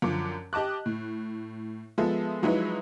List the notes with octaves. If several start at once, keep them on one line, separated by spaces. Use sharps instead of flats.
F#2 D3 F3 D6
G4 D#5 A5 D6 F#6
A2
F3 G#3 B3 A4 E5
F3 F#3 G#3 D#4 E4 B4